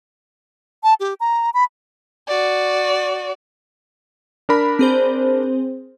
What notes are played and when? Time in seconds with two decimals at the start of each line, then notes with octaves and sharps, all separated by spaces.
0.83 A5
1.00 G4
1.20 A#5
1.54 B5
2.28 F#4 D5
4.49 D4 A#4 B5
4.79 C4 G#4 C5